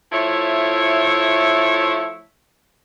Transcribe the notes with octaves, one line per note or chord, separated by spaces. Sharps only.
F3 A3 E4 C#5